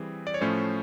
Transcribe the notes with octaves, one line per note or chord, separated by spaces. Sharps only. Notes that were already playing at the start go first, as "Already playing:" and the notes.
Already playing: E3 G3 C4 G#4
D5
C#5
A2 F3 A3 C#4 C5